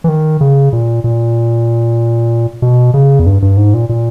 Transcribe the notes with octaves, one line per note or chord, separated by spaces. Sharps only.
E3
D#3
C#3
A#2
A#2
B2
C#3
E2
G2
G2
G#2
A#2
A#2